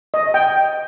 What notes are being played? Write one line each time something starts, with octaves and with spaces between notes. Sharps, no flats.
D#5
G5